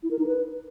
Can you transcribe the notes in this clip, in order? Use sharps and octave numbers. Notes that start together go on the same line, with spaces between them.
E4
A#4
D#4
B4